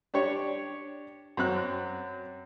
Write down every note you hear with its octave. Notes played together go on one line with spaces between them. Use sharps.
D4 G4 C#5
F#2 C4 F#6